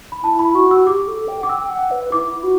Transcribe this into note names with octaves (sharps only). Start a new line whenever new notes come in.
B5
E4 A5
B5
F#4 C#6
E6
G4 D6
A4
G5
F#5 D6
G5 E6
G5
F#5
B4
E4 D6
F#4